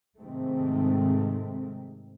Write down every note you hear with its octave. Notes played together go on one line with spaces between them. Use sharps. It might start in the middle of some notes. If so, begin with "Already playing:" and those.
G#2 C3 D#3 G#3 A3 C4